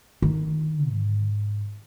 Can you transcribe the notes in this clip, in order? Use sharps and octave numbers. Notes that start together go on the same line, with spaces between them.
D#3
G#2